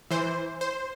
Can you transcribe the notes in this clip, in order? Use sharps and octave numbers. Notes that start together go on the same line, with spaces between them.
E3 C5
C5